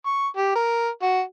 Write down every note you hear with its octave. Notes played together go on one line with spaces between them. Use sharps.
C#6
G4
A#4
F#4